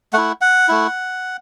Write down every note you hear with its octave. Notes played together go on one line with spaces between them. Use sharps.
A3 E4 F#5
F#5
A3 E4